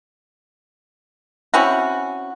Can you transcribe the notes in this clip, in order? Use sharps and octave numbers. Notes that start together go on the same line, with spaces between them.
C4 C#4 E4 F#4